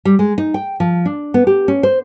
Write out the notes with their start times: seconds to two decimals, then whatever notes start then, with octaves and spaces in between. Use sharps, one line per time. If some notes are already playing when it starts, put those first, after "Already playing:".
0.05 G3
0.19 G#3
0.38 D#4
0.54 G5
0.80 F3
1.05 D4
1.34 B3
1.47 G4
1.68 C#4
1.83 C5